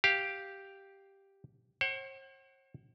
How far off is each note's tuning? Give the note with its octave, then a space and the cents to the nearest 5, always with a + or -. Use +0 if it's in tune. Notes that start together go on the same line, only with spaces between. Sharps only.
G4 +0 F5 +0
C5 +45 F#5 +35